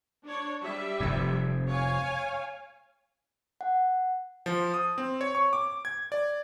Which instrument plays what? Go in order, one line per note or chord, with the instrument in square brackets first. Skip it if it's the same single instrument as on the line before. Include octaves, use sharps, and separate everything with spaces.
[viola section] D4 C#5
G3 E5
[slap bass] F1 F2
[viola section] C#5 F5 G#5
[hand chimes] F#5
[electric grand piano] F3
D#6
C4
C#5
C#6
D6
G#6
D5